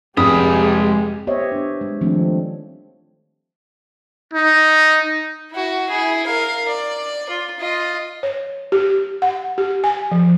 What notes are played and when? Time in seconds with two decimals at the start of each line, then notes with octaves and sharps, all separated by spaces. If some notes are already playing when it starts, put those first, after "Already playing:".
0.17 F1 G#3 G4 G#4 B5 D#6
1.27 B3 G4 C5 C#5 D#5 E5
1.52 B3 D4
1.81 G#3
2.01 D#3 F3 G3 A3 C4 D4
4.33 D#4
5.52 E4 F#4
5.89 E4 G#4
6.26 A#4 F5
6.68 D5
7.29 F4
7.59 F4 D#5
8.23 C#5
8.72 G4
9.22 F#5
9.58 G4
9.84 G#5
10.11 F3